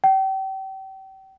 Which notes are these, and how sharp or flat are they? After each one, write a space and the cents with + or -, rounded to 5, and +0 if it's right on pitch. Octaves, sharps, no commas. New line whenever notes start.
G5 -35